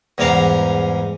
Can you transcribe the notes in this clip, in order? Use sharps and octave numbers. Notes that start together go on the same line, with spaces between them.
E2 G#2 G3 A#4 F5 F#5